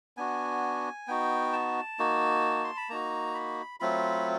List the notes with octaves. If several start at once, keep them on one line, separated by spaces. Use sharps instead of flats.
B3 D4 F#4 G#5
B3 D#4 F#4 G5
A5
A#3 D#4 F#4
C6
B5
A#3 D#4 F#4 A#5
B5
F#3 A3 C4 F4 B5